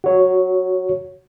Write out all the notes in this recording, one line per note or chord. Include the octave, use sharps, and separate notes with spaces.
F#4 C#5